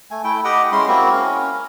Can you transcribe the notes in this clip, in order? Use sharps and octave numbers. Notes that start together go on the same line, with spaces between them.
A3 G#5
A3 E4 G5
G4 D#5 F#5 G5
G#3 C#4 E4 C6
A#3 C4 E4 F#4
C#4 A#4